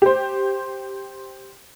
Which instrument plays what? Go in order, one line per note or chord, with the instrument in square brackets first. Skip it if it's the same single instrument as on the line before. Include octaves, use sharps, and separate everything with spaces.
[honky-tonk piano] G4 C5